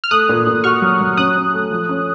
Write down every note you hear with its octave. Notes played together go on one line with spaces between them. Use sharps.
F6
A3 D#6 F#6
A#2
A#2
F#4 C#6 F6
F#3
F#3
C#4 D#6 F#6
C#4
A3
F3
C#4